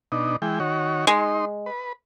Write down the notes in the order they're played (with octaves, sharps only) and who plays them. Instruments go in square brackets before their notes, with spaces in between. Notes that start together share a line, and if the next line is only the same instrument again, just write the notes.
[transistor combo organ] B2 D4 D#4
E3 G#3 G5
D#3 F#4 C#5
[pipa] G#3 [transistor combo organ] D#4 C6
[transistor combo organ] B4